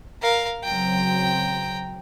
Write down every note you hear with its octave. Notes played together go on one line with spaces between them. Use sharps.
A#4 F5
C#3 F#3 C4 G5 A#5